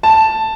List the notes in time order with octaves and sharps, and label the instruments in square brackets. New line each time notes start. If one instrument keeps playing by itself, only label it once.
[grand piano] A5